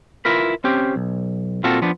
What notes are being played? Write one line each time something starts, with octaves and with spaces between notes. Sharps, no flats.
E4 F4 A#4 B4
C4 C#4 G4
B1
A#2 C4 F4 F#4 A4
F3 B3 D4